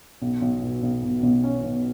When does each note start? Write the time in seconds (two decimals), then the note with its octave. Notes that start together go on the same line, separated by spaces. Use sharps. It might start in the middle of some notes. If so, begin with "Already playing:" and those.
0.22 B1
0.42 B1
0.62 B2
0.83 B1
1.02 B2
1.23 B1
1.44 C#4
1.63 B1